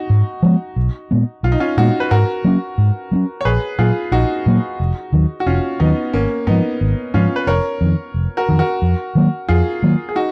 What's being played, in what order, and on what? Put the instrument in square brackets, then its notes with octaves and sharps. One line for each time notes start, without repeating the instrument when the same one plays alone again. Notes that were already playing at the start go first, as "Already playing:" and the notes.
Already playing: [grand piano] D#4 F#4
[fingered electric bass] G#2
F3 G#3 B3
B1
A#2 G#3 B3
[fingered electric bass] B1 [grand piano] F4
[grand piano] D#4
C#4 F4
[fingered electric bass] A#2 G#3 B3 [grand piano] D#4 F#4
[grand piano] B4
[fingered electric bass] G#2 [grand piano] F#4 A#4
[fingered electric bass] F#3 A#3 C#4
G#2
F#3 A#3 C#4
[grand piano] C#5
[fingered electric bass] A#1 [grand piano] G#4 B4
[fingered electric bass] A#2 F#3 A#3 [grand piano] F4 G#4
[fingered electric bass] A#1 [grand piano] D#4 F#4
[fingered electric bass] A#2 F#3 A#3
F1
D#2 D#3 F#3
[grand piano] F#4
[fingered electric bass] F1 [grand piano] C#4 F4
[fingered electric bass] D#2 D#3 F#3 [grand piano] B3 D#4
[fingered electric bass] G#1 [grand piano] A#3 C#4
[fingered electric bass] G#2 F3 [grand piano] B3 D#4
[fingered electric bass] G#1
[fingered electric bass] G#2 F3 [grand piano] C#4 F4
[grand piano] B4
[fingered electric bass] F1 [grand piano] A#4 C#5
[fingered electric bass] F2 D#3
F1
[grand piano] F#4 A#4
[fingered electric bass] F2 D#3
[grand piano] F#4 A#4
[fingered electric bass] F2
D#3 F#3 A#3
[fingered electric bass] F2 [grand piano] F4 G#4
[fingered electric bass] D#3 F#3 A#3
[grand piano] G#4
D#4 F#4